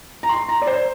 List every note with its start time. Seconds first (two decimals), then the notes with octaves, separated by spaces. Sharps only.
0.23 A#5
0.29 C6
0.49 A#5
0.62 D5
0.67 C5